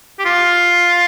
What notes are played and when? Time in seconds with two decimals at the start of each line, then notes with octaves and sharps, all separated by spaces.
0.19 G4
0.25 F4